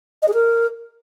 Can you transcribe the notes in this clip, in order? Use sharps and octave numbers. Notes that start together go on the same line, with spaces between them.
D#5
G#4
A#4